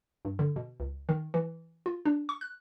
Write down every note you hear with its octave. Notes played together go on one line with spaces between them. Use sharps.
G2
D3
B2
C#2
D#3
E3
F4
D4
C#6
F#6